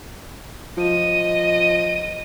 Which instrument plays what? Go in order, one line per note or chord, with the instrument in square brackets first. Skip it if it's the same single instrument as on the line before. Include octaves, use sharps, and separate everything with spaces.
[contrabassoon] F3 [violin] D#5 D#7